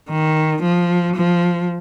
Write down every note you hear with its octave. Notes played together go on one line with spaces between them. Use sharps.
D#3
F3
F3